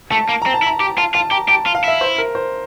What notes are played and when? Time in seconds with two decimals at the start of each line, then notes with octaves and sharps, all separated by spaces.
0.11 A3 A5
0.29 A#3
0.42 C4 A#5
0.54 A5
0.62 E4
0.66 A#5
0.80 G4
0.98 F4 A5
1.14 F4 A5
1.31 G4 A#5
1.49 G4 A5
1.66 F4
1.75 F5
1.84 E4 E5
2.01 C5
2.18 A#4
2.35 C5